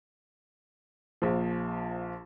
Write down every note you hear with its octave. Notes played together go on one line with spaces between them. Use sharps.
A#1 F3